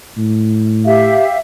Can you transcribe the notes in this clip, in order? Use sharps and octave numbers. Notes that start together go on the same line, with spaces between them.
A2
G4 E5 F5